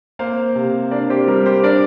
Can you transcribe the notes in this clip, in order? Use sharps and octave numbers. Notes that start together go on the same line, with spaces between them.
A#3 C5 F5
C3
D4 A#4 D5
G4 C5
G3 A#4
G4 C5
D4 A#4 D5